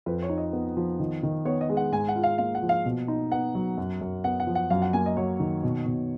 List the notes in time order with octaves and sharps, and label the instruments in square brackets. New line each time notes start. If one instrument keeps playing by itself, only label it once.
[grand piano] F2 [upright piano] B4
[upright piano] C#5
[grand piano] D#4
[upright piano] D#5
[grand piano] B3
F3
D#3
D#3
[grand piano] B3 [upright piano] C#5
[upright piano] D#5
[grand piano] G#3
[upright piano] F#5
[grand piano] G#2 [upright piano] G#5
[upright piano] F#5
[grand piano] F4
[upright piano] F5
[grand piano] A#3 [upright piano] F5
[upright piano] F#5
[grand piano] F3
[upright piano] F5
[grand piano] B2
D#4
[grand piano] B3 [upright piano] F#5
[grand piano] F#3
F#2
F#2
[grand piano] B3 [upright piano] F#5
[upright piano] F#5
[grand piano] F3
[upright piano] F#5
[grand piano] F#2 [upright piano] F5
[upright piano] F#5
[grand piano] A#3 [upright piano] G#5
[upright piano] D#5
[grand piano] F#3 [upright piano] C#5
[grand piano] D#3
B2
B2